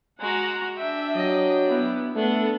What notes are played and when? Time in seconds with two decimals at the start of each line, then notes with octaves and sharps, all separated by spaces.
0.20 G#3 F#4 F#5 A#5
0.78 D4 E5 G5
1.16 F#3 D#5
1.67 B3 E4
2.16 A3 B3 D4 A4